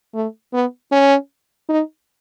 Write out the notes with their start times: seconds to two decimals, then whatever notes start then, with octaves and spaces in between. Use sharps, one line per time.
0.14 A3
0.53 B3
0.92 C#4
1.69 D#4